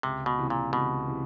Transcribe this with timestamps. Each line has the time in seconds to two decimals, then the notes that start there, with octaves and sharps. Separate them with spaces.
0.03 C#2 C3
0.26 B2
0.39 C3 E3
0.50 A#2
0.72 C#2 B2
1.07 C3 E3